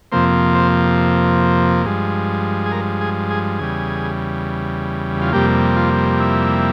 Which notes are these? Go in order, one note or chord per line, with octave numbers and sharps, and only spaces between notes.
F2 C3 F3 A#3 C5
C5
G2 F3 G#3
G#4
A#4
G#4
G#4
E2 C#3 G3 G#4
F4
F2 C3 G3 A#3 G4
F4
E4